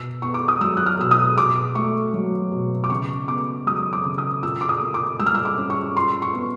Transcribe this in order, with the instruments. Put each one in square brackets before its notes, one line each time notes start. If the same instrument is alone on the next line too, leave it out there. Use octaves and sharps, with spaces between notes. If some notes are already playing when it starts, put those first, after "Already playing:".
Already playing: [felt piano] B2 E6
B3 C#6
D6
D#6
F#3 E6
F#6
F6
B2 E6
D#6
B2 D6
A3 C#6
F#3
B2
D6
C#3 C#6
B3 D6
F#3 D#6
D6
C#3
D#6
A#2 E6
D6
D#6
A#3
D6
G3 E6
F6
E6
D6
C#4
C#6
A#2 C6
C#6
B3